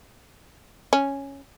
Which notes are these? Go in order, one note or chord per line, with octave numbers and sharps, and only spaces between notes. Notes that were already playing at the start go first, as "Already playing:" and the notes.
C#4